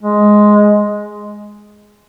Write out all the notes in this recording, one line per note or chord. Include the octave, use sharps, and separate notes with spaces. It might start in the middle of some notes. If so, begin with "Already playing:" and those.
G#3